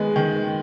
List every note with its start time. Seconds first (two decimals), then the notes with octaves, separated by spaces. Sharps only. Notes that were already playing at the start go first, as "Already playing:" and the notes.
Already playing: D#3 G#3 B3
0.16 D#3